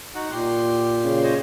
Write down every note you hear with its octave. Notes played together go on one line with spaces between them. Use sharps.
D#4 F#4 F#5
A#2 G4 C6
C#3
C5 C#5 D#5